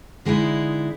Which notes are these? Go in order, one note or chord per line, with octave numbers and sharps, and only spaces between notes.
D3 G#3 B3 D#4 E4